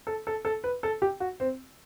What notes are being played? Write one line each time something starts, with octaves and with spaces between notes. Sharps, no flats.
A4
A4
A4
B4
A4
G4
F#4
C4